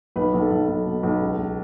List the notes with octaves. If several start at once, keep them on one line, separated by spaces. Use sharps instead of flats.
B1 B4
B1
A4
B1
B1
B2
B1
C#2
C#2